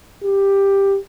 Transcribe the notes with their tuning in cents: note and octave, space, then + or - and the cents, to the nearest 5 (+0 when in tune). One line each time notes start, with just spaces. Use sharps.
G4 +10